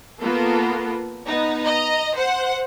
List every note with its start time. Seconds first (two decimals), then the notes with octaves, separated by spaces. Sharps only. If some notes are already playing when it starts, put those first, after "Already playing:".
0.20 A#3 B3 F4 A4 A#4
1.27 B3 D#4
1.64 D#5 A#5
2.15 C5 F#5